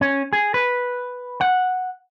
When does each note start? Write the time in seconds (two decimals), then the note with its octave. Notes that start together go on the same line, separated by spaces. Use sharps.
0.01 C#4
0.33 G#4
0.54 B4
1.41 F#5